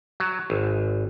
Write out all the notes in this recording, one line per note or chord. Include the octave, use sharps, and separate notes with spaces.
F#3
G#1